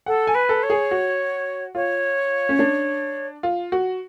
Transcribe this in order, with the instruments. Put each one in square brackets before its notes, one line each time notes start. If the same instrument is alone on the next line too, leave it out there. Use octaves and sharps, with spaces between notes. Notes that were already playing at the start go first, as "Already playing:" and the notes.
[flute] A4 [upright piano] F#5
[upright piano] G#5
[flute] B4
[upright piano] A4
[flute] C#5
[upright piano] G#4
F#4
[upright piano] F4 [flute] C#5
[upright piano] C#4
D4
F4
F#4